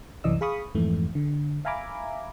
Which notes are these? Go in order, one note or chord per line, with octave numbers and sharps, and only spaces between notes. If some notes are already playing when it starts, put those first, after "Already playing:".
C2 F#2 E3 D5 D#5 E6
G#4 F5 B5 C#6 D#6
F2 G#2 E3 A3
D3
E5 F5 G#5 A#5 B5 D6